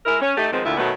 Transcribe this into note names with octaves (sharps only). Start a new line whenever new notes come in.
G#3 E4 A#4
C#4
A3 D#4 G4
D#3 F3 G#3 B3 C4
D2 A#2 D3 E4 F4 E5
B2 D#3 F#3 A3 B3